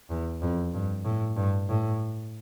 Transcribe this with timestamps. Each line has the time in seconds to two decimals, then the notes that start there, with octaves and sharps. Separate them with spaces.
0.10 E2
0.41 F2
0.73 G2
1.05 A2
1.36 G2
1.69 A2